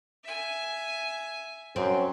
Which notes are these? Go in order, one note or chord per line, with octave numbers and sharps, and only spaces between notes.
E5 G#5
F#2 C4